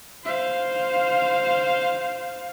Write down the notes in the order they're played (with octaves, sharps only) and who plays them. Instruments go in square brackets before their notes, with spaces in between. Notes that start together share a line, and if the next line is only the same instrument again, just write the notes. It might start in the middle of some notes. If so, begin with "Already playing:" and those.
[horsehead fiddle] C5 F5